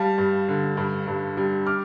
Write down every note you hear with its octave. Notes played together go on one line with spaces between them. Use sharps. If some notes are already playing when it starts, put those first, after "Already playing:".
Already playing: G3 F5 A5
G2
D3
G2
G2
G3
D6 F6